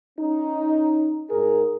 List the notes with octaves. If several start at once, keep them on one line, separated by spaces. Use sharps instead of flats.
C#4 D#4
G#2 G#4 A#4